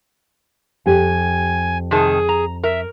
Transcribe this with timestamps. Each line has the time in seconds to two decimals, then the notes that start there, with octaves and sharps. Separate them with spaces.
0.86 F2 G4 G#5
1.91 C3 D#3 G#4 A5
2.29 A#5
2.63 A#4 E5